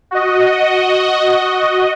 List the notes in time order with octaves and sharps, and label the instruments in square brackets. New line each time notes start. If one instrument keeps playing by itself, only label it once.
[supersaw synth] F#4 D#5